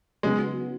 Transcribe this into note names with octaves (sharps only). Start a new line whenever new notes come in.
C#3 F#3 G#3 B3